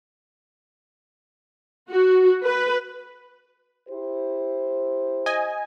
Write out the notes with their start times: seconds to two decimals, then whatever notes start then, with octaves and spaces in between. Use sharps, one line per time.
1.91 F#4
2.44 B4
3.89 E4 G4 C5
5.26 D#5 G#5